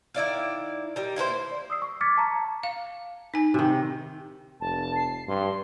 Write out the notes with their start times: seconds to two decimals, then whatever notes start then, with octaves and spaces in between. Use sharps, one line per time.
0.14 D#3 E4 D5 F5
0.96 D#3 G3
1.16 A#3 E4 A#4 C5
1.51 D5
1.70 D#6 E6 C7
1.82 C#6
2.01 D6 F6 G#6 A6 B6 C#7
2.18 A5 A#5 C#6
2.63 F5
3.34 D#4 G#5
3.54 C3 D#3
4.61 F1 A5
4.96 C7
5.28 G2 C6